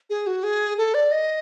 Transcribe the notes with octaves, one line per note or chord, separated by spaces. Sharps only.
G#4
F#4
G#4
A4
D5
D#5